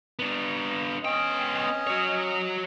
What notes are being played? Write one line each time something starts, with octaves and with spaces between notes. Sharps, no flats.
B3 D4
B3 C#4 D#5 G5
F#4 C#5